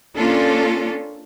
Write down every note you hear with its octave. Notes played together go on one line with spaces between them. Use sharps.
A#3 C#4 D4 F4 A4